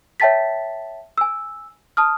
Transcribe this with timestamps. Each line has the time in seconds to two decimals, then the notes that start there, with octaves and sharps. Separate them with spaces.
0.20 C#5 E5 G5 A5 A6 B6
1.18 G#5 E6
1.97 A5 D#6 F6